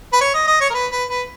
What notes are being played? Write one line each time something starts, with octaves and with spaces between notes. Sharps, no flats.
B4
C#5
D#5
D#5
C#5
A#4
B4
B4
B4